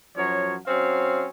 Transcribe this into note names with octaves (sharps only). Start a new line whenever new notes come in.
F#2 F3 F#3 C#5
F#3 C4 C#4 F5